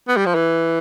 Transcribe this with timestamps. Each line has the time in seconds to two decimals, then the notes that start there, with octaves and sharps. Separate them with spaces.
0.08 B3
0.17 G3
0.26 F3
0.35 E3